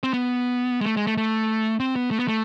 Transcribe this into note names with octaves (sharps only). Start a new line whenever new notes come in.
C4
B3
G#3
A3
G#3
A3
A3
C4
B3
A3
B3
A3